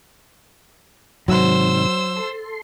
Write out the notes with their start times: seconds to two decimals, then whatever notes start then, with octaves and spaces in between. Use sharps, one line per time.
1.28 G#2 C3 D#3 F#3 C5 E6
2.16 A4 C6